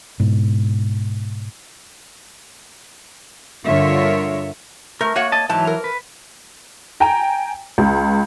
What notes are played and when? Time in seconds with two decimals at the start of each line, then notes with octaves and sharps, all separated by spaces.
0.20 G#2 B2
3.65 G2 D3 F4 A#4 C#5 E5
5.01 A3 A#4
5.16 A#3 F#4 C#5 F#5
5.32 D#5 A5
5.49 G#2 E3 F#3 E4 A5
5.67 A#4
5.84 B4
7.00 G5 G#5 A#5
7.78 C#2